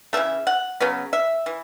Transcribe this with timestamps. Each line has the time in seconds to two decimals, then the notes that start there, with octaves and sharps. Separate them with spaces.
0.13 C#3 E3 A3 E5
0.47 F#5
0.80 C#3 F#3 B3
1.13 E5
1.46 E3